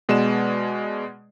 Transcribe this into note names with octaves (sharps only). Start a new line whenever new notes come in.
B2 G#3 B3 D5 E7